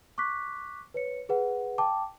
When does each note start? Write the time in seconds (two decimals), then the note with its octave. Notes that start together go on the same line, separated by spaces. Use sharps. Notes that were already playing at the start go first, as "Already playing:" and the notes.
0.18 C#6 D6 F#6 B6
0.94 B4 C#5 C#7
1.29 G#4 B4 F#5
1.78 G5 A5 D6